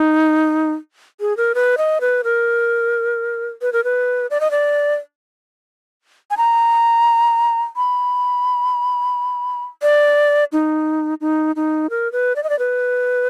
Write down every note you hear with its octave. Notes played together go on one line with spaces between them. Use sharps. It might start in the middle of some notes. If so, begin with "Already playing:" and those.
Already playing: D#4
G#4
A#4
B4
D#5
B4
A#4
B4
A#4
B4
D5
D#5
D5
G#5
A#5
B5
D5
D#4
D#4
D#4
A#4
B4
D5
D#5
D5
B4